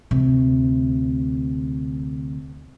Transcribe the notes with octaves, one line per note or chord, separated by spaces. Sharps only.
D2 C3